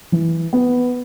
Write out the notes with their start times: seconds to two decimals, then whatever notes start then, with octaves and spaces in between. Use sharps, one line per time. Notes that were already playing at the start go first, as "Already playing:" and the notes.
0.12 E3
0.53 B3